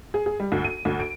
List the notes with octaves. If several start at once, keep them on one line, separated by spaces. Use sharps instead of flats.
G#4
G#4
G3
D2
D#7
D2
D7